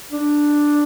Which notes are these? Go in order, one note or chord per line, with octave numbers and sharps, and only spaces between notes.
D4